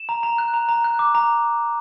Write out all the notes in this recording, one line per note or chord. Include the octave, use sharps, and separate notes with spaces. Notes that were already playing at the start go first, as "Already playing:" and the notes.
Already playing: E7
A#5
A#5
F#6
A#5
A#5
F#6
D6
A#5